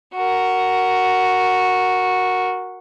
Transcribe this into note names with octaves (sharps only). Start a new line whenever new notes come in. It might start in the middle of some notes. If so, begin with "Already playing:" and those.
F#4 A#4